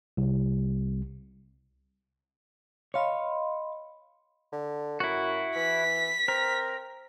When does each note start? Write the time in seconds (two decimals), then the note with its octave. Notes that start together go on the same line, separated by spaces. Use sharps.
0.17 C2
2.94 C#5 D#5 F5 B5 C6
4.53 D3
5.00 F#2 E4 F#4
5.56 E3 B6
6.28 C4 A#4